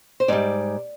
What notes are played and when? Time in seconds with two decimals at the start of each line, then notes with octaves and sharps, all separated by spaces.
0.20 C5
0.28 G#2 G3 D5